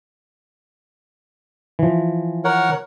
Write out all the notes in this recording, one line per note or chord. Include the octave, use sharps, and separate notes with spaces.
E3 F3
A#4 C#5 F#5